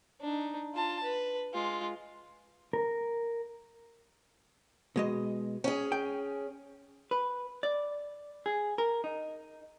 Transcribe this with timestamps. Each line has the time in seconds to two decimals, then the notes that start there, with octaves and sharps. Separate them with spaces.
0.21 D4 D#4
0.74 F4 A5
1.03 B4
1.53 G#3 F4
2.73 A#4
4.96 B2 G#3 D#5
5.64 C#4 G#4
5.92 G5
7.11 B4
7.63 D5
8.46 G#4
8.78 A#4
9.04 D#4